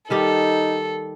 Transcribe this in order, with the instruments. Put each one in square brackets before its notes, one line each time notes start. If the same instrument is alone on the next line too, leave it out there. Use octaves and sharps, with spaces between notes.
[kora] D#3 G3 G4 [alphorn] D#4 [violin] A4